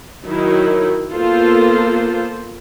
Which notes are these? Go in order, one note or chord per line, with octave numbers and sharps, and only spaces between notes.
D#3 F#3 D#4 E4
A#3 B3 F4 A4 C5